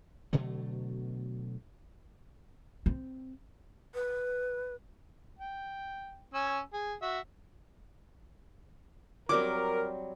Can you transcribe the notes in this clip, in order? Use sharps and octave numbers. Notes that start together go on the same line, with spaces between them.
B2 D3 F#3 A3
C4
B4
G5
C#4 G#5 E6
G#4
F#4 E5
F#3 G3 C4 A#4 D6